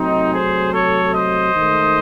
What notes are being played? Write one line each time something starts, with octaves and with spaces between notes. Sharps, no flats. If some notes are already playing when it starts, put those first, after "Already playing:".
Already playing: C3 F#3 A3 C4 D#4
G#4 C5
A4 C#5
C5 D#5
G#2 D#3 A3